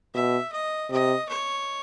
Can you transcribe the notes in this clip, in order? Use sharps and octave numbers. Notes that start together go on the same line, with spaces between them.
B2 E5
D#5
C3 D#5
C#5